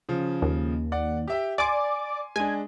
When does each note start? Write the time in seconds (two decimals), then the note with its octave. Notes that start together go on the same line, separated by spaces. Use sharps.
0.09 C#3 F3
0.42 D#2
0.92 D5 F#5
1.28 G4 E5 G5
1.58 D5 G#5 C6 D6
2.36 G#3 D4 G#5